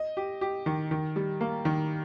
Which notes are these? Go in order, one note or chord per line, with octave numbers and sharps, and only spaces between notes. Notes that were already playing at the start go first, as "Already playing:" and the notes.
Already playing: D#5
G4
G4
D#3
D#3
G3
A#3
D#3